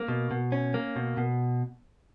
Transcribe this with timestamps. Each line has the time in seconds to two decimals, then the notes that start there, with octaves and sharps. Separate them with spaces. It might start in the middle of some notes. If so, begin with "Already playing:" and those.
Already playing: A#3
0.08 B2
0.31 B2
0.52 C#4
0.74 A#3
0.96 B2
1.17 B2